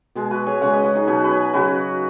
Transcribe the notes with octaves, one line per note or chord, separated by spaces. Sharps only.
B2 G#3
F#4 B4
G#4 C#5
C#3 G#3 C#5 F#5
B4 D#5
F#4 B4
D#4 G#4
B2 F#3 F#4 B4
B4
G#4 C#5
C#3 F#3 F#4 B4